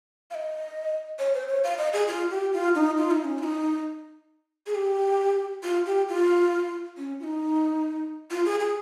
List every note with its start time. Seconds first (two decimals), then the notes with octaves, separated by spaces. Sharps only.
0.31 F5
0.35 D#5
1.19 C#5
1.34 C5
1.48 C#5
1.64 F5
1.78 D#5
1.93 G#4
2.08 F4
2.31 G4
2.53 F4
2.75 D#4
2.98 F4
3.11 D#4
3.24 C#4
3.38 F4
3.43 D#4
4.67 G#4
4.75 G4
5.63 F4
5.86 G4
6.09 F4
6.98 C#4
7.20 F4
7.24 D#4
8.31 F4
8.45 G#4
8.60 G#4